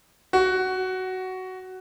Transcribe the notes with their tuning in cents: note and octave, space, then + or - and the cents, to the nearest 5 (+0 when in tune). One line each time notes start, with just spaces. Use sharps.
F#4 +10